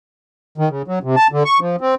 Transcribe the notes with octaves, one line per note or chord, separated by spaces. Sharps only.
D#3
C#3
F#3
C3
A5
D3
C#6
F3
C4